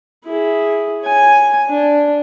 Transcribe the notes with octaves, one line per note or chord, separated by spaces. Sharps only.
E4 G#4
C#5 G#5
D4